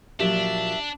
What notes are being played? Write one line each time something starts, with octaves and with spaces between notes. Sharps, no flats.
A#2 F3 F#3 D4 G4 E5 B6 E7